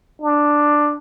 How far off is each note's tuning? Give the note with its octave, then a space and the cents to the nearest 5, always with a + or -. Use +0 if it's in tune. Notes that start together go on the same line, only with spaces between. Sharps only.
D4 +5